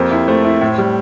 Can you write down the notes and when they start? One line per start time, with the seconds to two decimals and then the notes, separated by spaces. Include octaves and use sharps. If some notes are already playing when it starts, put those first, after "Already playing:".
Already playing: F2 A#3 G4 A4 C5
0.11 E4
0.28 A3 C5
0.45 E4
0.61 A2
0.78 G3